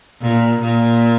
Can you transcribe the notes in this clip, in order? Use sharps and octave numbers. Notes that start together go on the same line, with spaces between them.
A#2
A#2